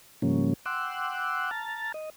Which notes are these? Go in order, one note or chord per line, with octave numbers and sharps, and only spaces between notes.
G#2 C#3 F3 G3 A#3 C#4
F#5 G5 C6 D6 E6 F#6
A5 A#5 F6 A6
D#5